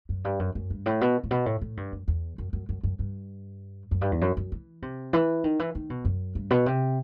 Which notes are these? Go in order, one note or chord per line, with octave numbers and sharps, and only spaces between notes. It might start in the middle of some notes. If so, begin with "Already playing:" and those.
F#2
G2
F#2
F#2
G2
A2
B2
A2
B2
A2
A2
G2
F#2
E2
F#2
F#2
F#2
F#2
G2
F#2
G2
E2
F#2
F#2
E3
C3
E3
D#3
E3
D#3
B2
F#2
G2
B2
C3